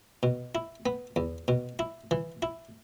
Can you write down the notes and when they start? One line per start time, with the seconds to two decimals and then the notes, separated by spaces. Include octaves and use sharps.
0.23 B2
0.55 E4
0.86 B3
1.16 E2
1.48 B2
1.79 E4
2.11 E3
2.42 E4